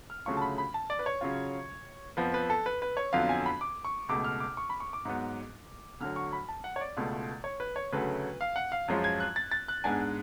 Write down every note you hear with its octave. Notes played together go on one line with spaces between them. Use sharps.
F6
D2 C#3 F#3 A3 F4 C#6
A5
B5
B5
A5
D5
B4
C#5
C#3 F#3 C#4 F4
F2 F3 B3 B4
B4
A4
B4
B4
C#5
F2 D3 F#3 B3 F4 F5
G#5
B5
D6
C#6
C#2 B2 A3 D6
F6
D6
C#6
B5
C#6
D6
G#2 F#3 B3
D2 D3 F#3 F6
C#6
B5
A5
F#5
C#5
D5
C#2 B2 A3 F4
C#5
B4
C#5
D2 C#3 F#3 A3 B4
F5
F#5
F5
F#2 F3 G#3 C#4 F4
G#6
F#6
A6
A6
F#6
G#2 G#3 B3 D4 G#5